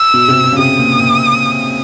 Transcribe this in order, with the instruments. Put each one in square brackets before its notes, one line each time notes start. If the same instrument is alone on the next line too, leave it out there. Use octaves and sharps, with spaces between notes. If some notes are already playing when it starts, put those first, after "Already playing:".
Already playing: [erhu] E6
[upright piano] B2
C3
B2
C#3
[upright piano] C3 [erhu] D#6
[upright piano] A#2
A#2